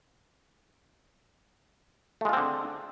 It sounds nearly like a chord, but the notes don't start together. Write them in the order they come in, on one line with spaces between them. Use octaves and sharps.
A3 G#3 F4 C4 D3